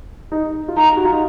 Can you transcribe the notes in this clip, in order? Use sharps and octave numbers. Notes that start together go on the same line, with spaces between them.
D#4
F4
D#4 A#5
F#4
F4
D#4